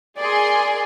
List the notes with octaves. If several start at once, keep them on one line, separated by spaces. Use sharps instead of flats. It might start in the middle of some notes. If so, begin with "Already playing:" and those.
G#4 A#4 D5 C6